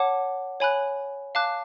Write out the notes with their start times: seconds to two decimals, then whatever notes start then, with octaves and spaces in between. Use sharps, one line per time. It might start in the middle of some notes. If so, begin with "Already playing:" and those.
Already playing: C#5 F#5 A5 D6
0.60 C#5 G#5 B5 F#6
1.35 F5 A5 D6 F#6